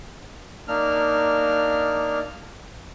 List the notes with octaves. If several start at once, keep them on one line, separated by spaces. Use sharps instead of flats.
A#3 D4 D#4 F6